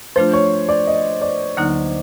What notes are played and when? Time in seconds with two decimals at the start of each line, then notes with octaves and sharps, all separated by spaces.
0.16 F3 A3 D4 F4 C5
0.33 C#5
0.69 D5
0.87 D#5
1.22 D5
1.57 D2 D3 F#3 A#3 D#4